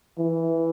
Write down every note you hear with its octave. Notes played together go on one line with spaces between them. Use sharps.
E3